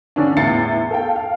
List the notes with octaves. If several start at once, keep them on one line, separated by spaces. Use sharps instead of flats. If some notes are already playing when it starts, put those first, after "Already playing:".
D3 C#4 D4
E2 A2 E4 A6 C7 C#7
A4 F5 G5
F5